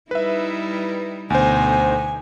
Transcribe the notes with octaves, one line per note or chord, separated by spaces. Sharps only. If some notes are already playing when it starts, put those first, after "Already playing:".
G3 D#4 E4 B4 E5
D2 B2 D3 D#4 C5 G#5